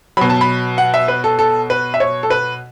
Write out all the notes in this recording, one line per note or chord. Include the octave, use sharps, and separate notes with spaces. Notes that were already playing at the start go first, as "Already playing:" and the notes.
B2 F#3 B5
A5
B5
F#5
E5
B4
A4
A4
B4
E5
C#5
A4
B4